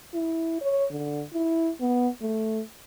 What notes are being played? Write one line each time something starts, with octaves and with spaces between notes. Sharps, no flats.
E4
C#5
D3
E4
B3
A3